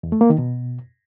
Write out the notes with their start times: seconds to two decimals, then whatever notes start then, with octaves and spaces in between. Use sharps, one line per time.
0.03 E2
0.12 A3
0.21 A#3
0.30 D#3
0.38 B2